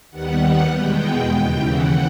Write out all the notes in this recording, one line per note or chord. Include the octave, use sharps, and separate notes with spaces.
D#2 D#3 G3 B3 F#5
E2 B2 G#3 B3 G5
D#2 C#3 E3 G5
F#5